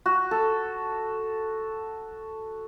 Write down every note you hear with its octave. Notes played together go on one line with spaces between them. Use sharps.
F#4
A4